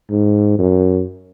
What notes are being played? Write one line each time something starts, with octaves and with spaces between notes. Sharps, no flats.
G#2
F#2